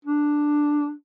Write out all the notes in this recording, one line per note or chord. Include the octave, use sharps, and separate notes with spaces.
D4